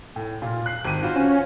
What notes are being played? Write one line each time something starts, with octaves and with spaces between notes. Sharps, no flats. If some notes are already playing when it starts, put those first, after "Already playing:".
A2
A#2 F4
F#6 C7
G#1 D#7
F4 F#4 C5
C#4